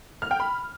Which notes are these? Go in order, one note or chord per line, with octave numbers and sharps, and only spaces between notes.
F6
G5
B5